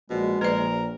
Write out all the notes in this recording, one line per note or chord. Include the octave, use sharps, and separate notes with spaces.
A#1 B2 G#3
A#1 A#4 B4 D5